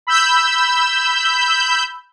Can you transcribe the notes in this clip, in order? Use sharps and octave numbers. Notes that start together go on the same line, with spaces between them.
B5 E6 G6